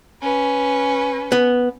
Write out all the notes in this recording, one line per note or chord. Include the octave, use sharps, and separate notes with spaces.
C#4 B4
B3